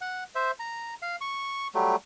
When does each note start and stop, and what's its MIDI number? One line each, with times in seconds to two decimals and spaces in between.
0.01 0.24 78
0.35 0.51 72
0.35 0.51 76
0.59 0.94 82
1.02 1.16 77
1.21 1.68 85
1.75 1.96 54
1.75 1.96 55
1.75 1.96 57